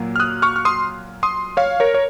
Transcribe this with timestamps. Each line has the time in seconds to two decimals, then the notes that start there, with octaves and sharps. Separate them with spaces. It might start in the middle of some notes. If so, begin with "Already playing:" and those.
Already playing: A#2 F#3 A#3
0.16 F6
0.20 D#6 F#6
0.42 C#6 F6
0.56 F6
0.65 C6 D#6
1.23 C6 D#6
1.57 C#5 F5
1.80 A#4 C#5
1.94 C#5